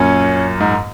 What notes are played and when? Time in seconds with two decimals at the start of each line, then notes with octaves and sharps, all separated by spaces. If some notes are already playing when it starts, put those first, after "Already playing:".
Already playing: F#2 A#2 C#4
0.60 G#2